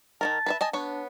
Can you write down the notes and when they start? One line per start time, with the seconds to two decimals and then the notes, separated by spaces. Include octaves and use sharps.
0.21 D#3 A3 A#4 A5
0.46 B4 C5 E5
0.61 D#5 G#5 A5
0.73 B3 D4 C#5